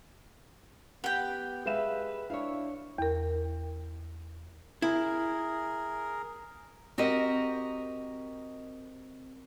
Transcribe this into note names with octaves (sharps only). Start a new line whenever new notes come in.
B3 G4 F#5 G5 B5
G#3 B4 E5 F5 E7
D4 E4 C#5 F5
E2 A#4
E4 G#4 A#4
C4 F#4 G4 A#4 D#5